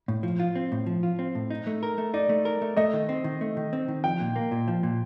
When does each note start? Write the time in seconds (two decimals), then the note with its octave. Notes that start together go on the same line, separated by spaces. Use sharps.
0.08 A2
0.23 F3
0.40 F4
0.56 C4
0.72 A2
0.86 F3
1.03 F4
1.19 C4
1.35 A2
1.50 D#4
1.67 A3
1.83 A#4
1.98 A3
2.14 D#4 D5
2.29 A3
2.45 A#4
2.61 A3
2.77 A3 D#5
2.93 D#3
3.09 C4
3.24 D#3
3.41 A3
3.57 D#3
3.73 C4
3.88 D#3
4.04 F3 G5
4.20 A#2
4.36 A#3
4.51 A#2
4.68 F3
4.83 A#2